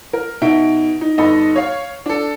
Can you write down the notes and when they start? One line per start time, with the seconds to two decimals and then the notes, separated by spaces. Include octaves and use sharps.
0.13 A#4
0.42 B2 D#4 E5 D7
1.01 D#4
1.18 G1 D#4 A4 D#5 B5
1.56 C#5 F5
2.06 D4 A4